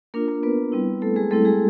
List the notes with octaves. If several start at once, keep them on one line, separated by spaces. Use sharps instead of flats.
A#3 D4 F4 A#4
A#3 A#4
B3 B4
G3 C4 E4
A3 A4
G#3 G#4
G3 A3 C4 E4 A4
G#3 G#4